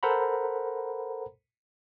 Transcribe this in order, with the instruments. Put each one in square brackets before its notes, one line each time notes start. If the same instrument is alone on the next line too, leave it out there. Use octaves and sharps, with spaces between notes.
[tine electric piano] A4 A#4 C5 F#5 A#5 B5